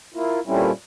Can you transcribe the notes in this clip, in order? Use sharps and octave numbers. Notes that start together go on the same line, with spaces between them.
A#3 E4 F4
A#2 G3 A3 C4 C#4 E4